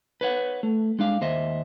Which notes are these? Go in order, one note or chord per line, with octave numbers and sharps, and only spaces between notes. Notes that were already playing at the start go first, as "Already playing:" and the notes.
B4 C#5 F#5
A3
G#3 D4 F5
D#2 C5 D#5 E5